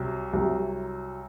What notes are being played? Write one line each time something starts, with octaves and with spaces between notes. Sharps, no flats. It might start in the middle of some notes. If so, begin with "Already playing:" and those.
Already playing: C2 C3 F#3
C2 C3 F#3